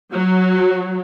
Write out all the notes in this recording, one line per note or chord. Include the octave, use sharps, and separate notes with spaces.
F#3